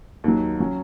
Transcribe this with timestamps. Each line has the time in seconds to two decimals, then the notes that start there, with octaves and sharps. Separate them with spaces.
0.24 D#2 D#3 F#3
0.60 F#3 C#4